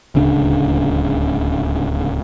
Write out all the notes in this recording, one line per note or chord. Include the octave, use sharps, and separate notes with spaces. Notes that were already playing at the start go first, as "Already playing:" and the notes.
D1 C#2 C#3 D4